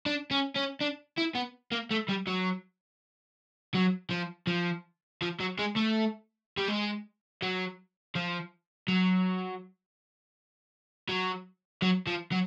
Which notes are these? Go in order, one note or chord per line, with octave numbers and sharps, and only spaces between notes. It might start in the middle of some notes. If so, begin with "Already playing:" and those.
D4
C#4
C#4
D4
E4
B3
A#3
A3
G3
F#3
F#3
F3
F3
F3
F#3
G#3
A3
G3
G#3
F#3
F3
F#3
F#3
F#3
F3
F#3